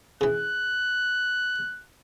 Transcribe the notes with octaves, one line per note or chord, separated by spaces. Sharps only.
C#3 E3 F#6